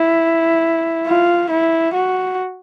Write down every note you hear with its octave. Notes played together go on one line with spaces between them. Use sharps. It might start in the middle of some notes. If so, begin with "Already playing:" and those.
Already playing: E4
F4
E4
F#4